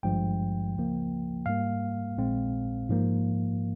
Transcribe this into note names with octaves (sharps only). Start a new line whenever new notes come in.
G#1 G2 F3 G#3 G5
C#2 C#3 F3 A#3
G#2 G3 A#3 F5
A#1 A#2 G#3 C4
G#2 F3 A#3